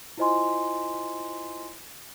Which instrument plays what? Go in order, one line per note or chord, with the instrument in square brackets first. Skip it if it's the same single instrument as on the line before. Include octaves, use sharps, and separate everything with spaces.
[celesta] E4 F4 C5 D#5 G#5 C6